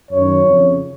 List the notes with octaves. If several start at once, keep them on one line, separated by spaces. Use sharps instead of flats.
F#2 D#3 C#5
F2 C#3